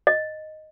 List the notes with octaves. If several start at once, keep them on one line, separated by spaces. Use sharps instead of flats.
D#5